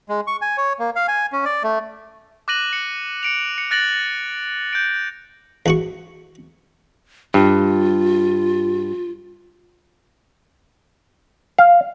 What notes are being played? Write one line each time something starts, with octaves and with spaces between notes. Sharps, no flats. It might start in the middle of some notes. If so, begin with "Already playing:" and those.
G#3
C#6
G#5
C#5
A#3
F5
G#5
C#4
D5
A3
D6 F#6 A#6 D#7 F#7
C#7
C#7 D7 F7
C#7
F#6 A6 A#6 D7 F#7
G6 D7
E2 F#4 C#6
G2 F4
F5